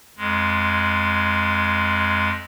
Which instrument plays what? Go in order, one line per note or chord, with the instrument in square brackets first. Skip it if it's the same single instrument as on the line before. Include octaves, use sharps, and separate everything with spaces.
[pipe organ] F2 G#3